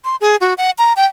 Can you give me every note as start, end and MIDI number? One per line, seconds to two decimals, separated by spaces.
0.05 0.16 84
0.21 0.36 68
0.41 0.54 66
0.58 0.71 78
0.78 0.93 82
0.96 1.05 79